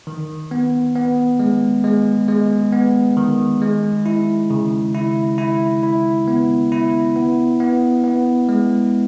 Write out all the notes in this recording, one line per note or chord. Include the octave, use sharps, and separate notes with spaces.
D#3
B3
B3
G#3
G#3
G#3
B3
D#3
G#3
E4
C#3
E4
E4
E4
B3
E4
B3
B3
B3
G#3